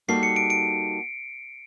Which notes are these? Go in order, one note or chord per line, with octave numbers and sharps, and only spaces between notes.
G3 A#3 D#4 F#4 A4 C7
C#7
D7
D7